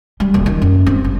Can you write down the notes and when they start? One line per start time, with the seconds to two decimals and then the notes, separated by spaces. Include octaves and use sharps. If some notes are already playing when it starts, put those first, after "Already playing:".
0.20 G3
0.34 D#1
0.46 D#3
0.62 F#2
0.86 C4
1.04 G1